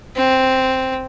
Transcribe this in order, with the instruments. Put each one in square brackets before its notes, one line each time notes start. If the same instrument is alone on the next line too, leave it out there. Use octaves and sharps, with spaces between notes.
[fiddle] C4